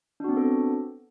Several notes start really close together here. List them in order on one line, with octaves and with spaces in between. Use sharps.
D4 F#4 C4 B3 A4